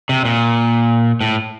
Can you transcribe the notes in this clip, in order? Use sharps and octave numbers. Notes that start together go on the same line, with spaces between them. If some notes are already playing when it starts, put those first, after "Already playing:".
C3
A#2
A2